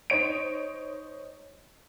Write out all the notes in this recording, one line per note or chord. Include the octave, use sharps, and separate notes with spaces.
D#4 C5 C#5 D7